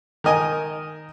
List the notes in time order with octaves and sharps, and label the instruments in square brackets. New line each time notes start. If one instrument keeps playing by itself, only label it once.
[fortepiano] D#3 A#4 D#5 G#5